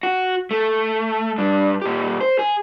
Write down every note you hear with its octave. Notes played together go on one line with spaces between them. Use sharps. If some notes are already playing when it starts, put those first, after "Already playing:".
F#4
A3
G2 D4
A#2 G4
C5
G#4